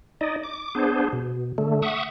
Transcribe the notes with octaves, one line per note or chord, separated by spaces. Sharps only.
D#4 D5 D#5
D6
B3 D4 G#4 C5
B2
D3 A3
E5 F#5 C#6 D#6